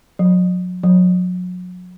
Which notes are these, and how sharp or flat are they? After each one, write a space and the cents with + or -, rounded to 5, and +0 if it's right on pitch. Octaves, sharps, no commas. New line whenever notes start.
F#3 -35
F#3 -35